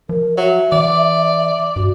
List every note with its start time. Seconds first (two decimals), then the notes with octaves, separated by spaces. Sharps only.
0.09 F3 A#4
0.37 F#3 E5
0.72 E3 D5
1.76 G2 F#4